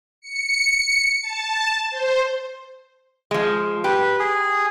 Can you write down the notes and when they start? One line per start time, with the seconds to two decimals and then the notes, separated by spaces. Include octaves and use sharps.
0.21 C#7
1.21 A5
1.90 C5
3.31 F3 G#3
3.84 G4 B4
4.20 G#4